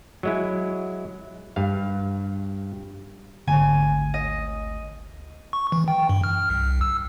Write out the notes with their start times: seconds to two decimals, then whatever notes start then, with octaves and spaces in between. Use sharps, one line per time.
0.23 F#3 G#3 E4
1.56 G2 F5
3.47 G#1 D2 D3 G#5
4.14 D#5
5.53 C#6
5.72 E3
5.88 G5
6.09 G2
6.24 F6
6.50 C2
6.81 E6